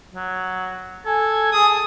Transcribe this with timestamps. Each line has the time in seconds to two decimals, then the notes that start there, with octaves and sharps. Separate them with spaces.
0.15 F#3
1.06 A4 G#5 G#6
1.52 G#4 A5 D#6